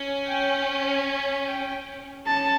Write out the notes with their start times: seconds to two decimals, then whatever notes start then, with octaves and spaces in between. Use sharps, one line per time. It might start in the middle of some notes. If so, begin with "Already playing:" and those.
Already playing: C#4
0.28 G5
1.47 G5
2.26 C#4 A5